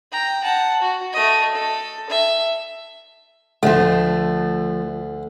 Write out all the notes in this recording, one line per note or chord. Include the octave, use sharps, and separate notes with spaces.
G5 A#5
F#5 A5
F#4
A3 D#5
A4
E5
D2 F3 A3